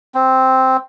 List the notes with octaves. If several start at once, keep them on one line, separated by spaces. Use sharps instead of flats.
C4